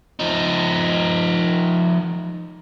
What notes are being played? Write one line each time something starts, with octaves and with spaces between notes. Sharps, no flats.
F3 D#4